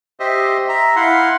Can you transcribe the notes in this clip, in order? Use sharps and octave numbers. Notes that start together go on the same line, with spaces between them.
G4 C5 D#5 E5
E5 A#5
E4 F5 F#5 C6